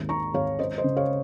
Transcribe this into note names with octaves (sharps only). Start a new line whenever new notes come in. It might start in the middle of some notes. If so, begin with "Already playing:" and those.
Already playing: G#1 D#2
G#2 A#5 C#6
G#1 C#5 F5
C#4 C5 D#5
C5 D#5
C#3
C#5 F5